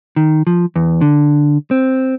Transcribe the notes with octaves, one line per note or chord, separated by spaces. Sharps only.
D#3
F3
E2
D3
C4